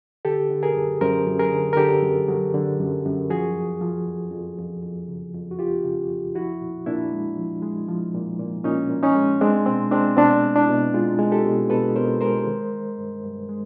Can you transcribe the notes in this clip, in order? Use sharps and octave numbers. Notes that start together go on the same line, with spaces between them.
D3 G4 A4
D3
G#4 A#4
F#2
F#2 A#4 C5
F#2
G#4 A#4
D3
A#4
D3 G4 A4
F#2
F#3
D3
F#2
F#2
F3 F#4 G#4
F2
F3
F2
F2
F2
F2
C#3
F2
F#4
F2 F4 G4
C#3
F2
F3 E4 F#4
A#2
A#2 D4 E4
G#3
F3
G#3
F3
A#2
A#2
A#2 C#4 D#4
A#2
C#4 D#4
G#3
G#3 C4 D4
B2 C4
G#3 C4 D4
B2 C4 D4
G#3
D4 E4
B2
G#3 D#4 F4
G#3
G4 A4
B2
B2 A4 B4
B2 A#4 C5
G#3 A#4 C5
D#3
D#3
G2
G2
G#3